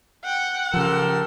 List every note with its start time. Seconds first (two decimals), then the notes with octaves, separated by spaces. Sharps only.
0.24 F#5 G5
0.74 C#3 F3 G4 A4 A#4 C6 E6